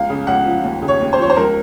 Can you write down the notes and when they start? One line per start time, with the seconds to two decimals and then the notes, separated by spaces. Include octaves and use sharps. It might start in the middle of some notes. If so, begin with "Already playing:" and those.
Already playing: C#2 F5
0.10 C#3
0.27 C#2 F#5
0.46 F3
0.64 D#2
0.82 C#3
0.88 C#5
1.01 D#2
1.13 C5
1.19 F3 C#5
1.30 C5
1.36 C#2 A#4